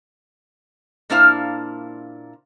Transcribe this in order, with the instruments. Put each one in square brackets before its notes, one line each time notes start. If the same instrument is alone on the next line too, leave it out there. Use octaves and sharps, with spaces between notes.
[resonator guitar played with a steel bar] A#2 A#3 D4 E4 C5 F5